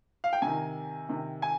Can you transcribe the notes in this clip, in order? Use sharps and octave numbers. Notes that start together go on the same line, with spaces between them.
F5
G5
C3 D#3 G#5
C3 D#3
G#5